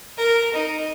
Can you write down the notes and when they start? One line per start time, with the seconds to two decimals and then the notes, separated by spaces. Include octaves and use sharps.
0.18 A#4
0.54 D#4